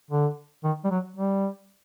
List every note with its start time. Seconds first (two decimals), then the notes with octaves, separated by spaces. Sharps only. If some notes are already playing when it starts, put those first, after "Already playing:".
0.10 D3
0.64 D#3
0.84 G3
0.90 F#3
1.16 G3